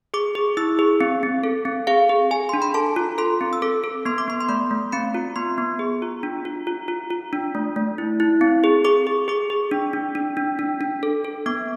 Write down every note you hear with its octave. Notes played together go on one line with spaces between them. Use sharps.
G#4 D6
G#4
E4 E6
G#4
C4
C4
A4
C4
G#4 F5
G#4
G#4 G#5
D4 C6
B5
A4 A5
F4
A4 C6
C4
E6
A4 D6
A4
B3 C6
D6
B3 C6
C6
A3 B5
A3
C4 B5
F4
B3 C6
B3
G#4
F4
D4
F4
F4
F4
F4
D4
A3
A3
E4
E4
C4
G#4
G#4 D6
G#4
G#4 D6
G#4
D4
D4
D4
D4
D4
D4
A4
A4
B3 D6